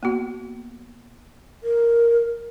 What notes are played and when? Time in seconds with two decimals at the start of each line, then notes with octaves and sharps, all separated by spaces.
0.03 A#3 B3 F#4
1.63 A#4